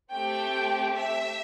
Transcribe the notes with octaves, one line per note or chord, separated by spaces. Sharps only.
A3 C4 G4 G5
E5